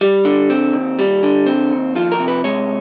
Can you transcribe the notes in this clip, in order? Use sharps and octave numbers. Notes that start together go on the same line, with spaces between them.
G3
D3
C4
D#2
G3
D3
C4
D#2
F3 F4
A#4
C3
B4
G#3 C#5